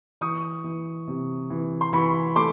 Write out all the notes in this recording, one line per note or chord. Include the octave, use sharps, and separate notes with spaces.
E3 C#6 D#6
E3
C3
E3
C6
E3 B5 C#6
A3 C6 D6